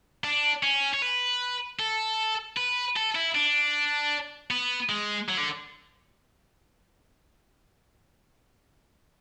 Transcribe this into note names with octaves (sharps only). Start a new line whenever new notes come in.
D4
C#4
C#5
B4
A4
B4
A4
E4
D4
B3
G#3
F#3
D3